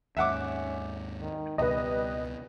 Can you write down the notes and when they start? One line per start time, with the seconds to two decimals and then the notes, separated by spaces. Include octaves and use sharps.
0.17 D#2 G#2 C#4 E5 F#5 D6
1.22 D#3
1.58 C#2 B2 G3 B4 D#5